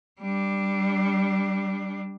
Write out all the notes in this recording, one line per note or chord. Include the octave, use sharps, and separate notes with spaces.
G3 D4